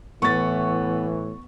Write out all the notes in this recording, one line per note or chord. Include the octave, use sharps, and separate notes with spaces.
A2 E3 B3 C#6 A6